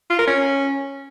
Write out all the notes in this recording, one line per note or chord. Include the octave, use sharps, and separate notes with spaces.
F4
A#4
C#4